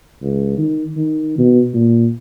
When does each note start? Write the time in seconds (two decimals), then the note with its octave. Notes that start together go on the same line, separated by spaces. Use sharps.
0.22 C#2
0.58 D#3
0.97 D#3
1.38 B2
1.74 A#2